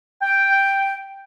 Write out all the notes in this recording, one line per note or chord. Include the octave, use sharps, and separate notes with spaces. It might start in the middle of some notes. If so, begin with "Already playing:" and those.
G5